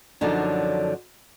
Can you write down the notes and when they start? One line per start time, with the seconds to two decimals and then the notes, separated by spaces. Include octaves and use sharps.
0.21 F#2 D3 F3 F#3 D4 D#4